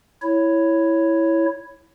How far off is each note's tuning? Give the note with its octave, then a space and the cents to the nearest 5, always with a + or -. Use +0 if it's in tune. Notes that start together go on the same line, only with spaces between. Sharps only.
E4 +0 C#5 +0